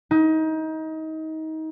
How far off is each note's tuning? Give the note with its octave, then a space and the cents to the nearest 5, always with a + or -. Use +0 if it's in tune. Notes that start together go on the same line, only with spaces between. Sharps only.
D#4 +25